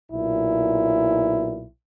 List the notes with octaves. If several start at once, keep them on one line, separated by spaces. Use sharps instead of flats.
B1 A#2 E4